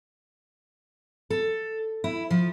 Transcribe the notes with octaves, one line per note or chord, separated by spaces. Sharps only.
A4
E4
F3